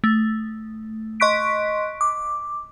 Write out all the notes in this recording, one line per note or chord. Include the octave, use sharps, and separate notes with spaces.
A3
D#5 C6 C#6 F#6 B6 D7
D6